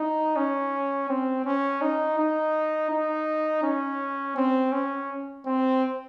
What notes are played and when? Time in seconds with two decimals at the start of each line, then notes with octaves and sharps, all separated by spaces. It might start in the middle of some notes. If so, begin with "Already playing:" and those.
Already playing: D#4
0.36 C#4
1.09 C4
1.45 C#4
1.81 D#4
2.18 D#4
2.91 D#4
3.63 C#4
4.37 C4
4.73 C#4
5.46 C4